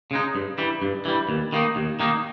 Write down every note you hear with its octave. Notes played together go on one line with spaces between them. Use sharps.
C#3 G#3 D#4
G2
E3 G3
G2
E3 G3
D#2
D#3 A#3 D#4
D#2
D#3 A#3 D#4